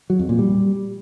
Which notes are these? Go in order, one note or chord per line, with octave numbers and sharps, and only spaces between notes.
F#3
F2
A#2
G3